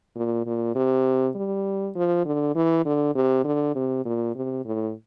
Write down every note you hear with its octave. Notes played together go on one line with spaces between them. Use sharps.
A#2
A#2
C3
G3
F3
D3
E3
D3
C3
D3
C3
A#2
C3
A2